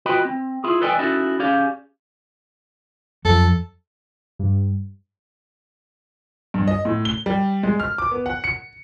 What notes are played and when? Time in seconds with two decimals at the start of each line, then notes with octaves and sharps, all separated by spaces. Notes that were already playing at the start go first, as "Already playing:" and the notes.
0.06 F4 F#4 B4 D#5 G5 B5
0.25 C4
0.64 E4 F4 G#4
0.81 A4 B4 D5 D#5 G5 G#5
0.98 C#4 D#4 E4 F#4 A4 E5
1.39 C#4 G4 G#4 D5 F5
3.25 F2 F3 F#3 A4
4.39 G2
6.54 G2
6.67 D#5
6.85 A2
7.05 G7
7.26 G3
7.63 G#3
7.80 F6
7.98 D6
8.11 B3
8.26 F#5
8.44 C#7